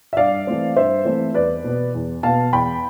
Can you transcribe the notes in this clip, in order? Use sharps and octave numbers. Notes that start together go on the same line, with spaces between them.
E5
G2 D5 F5
E3 A3 C4
G2 C5 E5
E3 A3 C4
E2 B4 D5
B2 B3
E2
B2 B3 F5 A5
E2 G5 B5